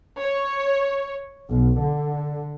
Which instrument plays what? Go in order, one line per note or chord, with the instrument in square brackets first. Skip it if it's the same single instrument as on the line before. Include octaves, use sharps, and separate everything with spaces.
[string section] C#5
B1
D3